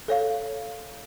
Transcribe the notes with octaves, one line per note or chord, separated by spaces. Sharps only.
A4 C#5 F5